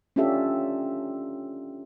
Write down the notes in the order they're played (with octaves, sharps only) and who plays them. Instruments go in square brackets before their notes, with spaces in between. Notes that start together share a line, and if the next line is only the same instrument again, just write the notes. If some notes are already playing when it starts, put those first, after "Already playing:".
[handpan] C#4 D4 F4 G4 A4 E5